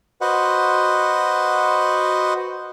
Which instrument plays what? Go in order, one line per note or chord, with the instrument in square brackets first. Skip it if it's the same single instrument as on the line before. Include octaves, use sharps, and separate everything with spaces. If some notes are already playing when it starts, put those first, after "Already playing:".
[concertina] F#4 B4 C5 D#5 F#5